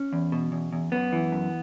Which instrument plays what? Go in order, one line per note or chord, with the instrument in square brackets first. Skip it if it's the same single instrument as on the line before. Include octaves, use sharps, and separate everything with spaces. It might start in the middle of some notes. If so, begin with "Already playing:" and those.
Already playing: [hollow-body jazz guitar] C#4
E2
B2
E2
E2
F#2 B3
E3
F#2